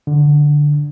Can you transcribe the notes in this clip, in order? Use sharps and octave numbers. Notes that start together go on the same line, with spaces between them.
D3